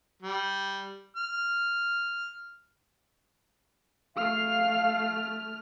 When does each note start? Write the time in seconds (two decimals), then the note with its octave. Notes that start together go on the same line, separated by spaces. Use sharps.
0.22 G3
1.16 F6
4.16 A3 F5 F6